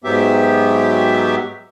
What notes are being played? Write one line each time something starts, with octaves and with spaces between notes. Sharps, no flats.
G#2 F#3 B3 G4 E5